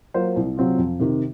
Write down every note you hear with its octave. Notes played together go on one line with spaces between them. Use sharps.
F#3 A#3 F4 C5
C2
C3 F#3 C4 F4
F2
C3 D#3